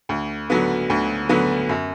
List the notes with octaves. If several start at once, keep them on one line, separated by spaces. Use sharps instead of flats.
D2
D3 F#3 B3
D2
D3 F#3 B3
F#2